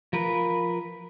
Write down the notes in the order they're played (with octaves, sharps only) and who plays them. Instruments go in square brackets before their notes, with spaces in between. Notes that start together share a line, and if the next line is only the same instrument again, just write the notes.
[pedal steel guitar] F3 A#4 B4